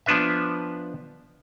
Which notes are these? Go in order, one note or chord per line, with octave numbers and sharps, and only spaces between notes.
F3 B3 D4 B4 E5